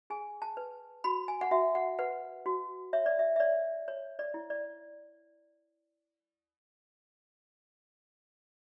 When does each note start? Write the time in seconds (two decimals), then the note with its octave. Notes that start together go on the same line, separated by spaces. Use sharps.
0.10 G#4 G#5
0.42 A5
0.57 B4
1.04 F#4 B5
1.28 G#5
1.41 F#5
1.51 F#4 E5
1.75 F#5
1.99 B4 F#5
2.46 F#4
2.93 C#5 E5
3.06 D5
3.19 E5
3.36 E5
3.40 C#5 D5
3.88 C#5
4.19 D5
4.34 E4
4.50 D5